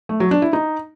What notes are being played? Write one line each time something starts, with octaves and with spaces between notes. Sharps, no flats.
A3
F#3
D4
E4
D#4